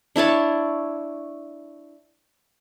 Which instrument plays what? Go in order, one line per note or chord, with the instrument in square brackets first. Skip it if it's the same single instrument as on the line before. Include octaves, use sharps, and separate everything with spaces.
[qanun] D4 E4 C#5 A5